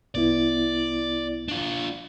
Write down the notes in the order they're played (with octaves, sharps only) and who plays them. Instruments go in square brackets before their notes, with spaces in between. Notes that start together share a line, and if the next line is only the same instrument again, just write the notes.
[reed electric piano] C2 B3 E4 [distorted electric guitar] D5
[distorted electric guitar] D4 F4